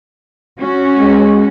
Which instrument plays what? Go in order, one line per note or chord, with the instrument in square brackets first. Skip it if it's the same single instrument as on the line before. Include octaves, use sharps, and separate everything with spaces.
[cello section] C#4 F#4
[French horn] G#3